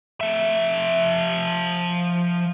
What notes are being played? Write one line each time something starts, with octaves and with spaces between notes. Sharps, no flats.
F3 E5